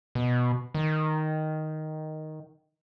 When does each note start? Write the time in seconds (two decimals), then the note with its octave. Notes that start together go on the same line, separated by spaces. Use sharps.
0.15 B2
0.74 D#3